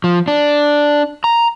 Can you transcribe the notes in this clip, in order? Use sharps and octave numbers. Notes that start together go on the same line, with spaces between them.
F3
D4
A#5